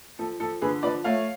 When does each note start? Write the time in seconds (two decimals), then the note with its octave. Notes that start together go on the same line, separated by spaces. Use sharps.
0.19 F3 A4
0.40 F3 A4
0.61 D3 G#4 B4
0.83 F3 B4 D5
1.04 A3 C#5 F5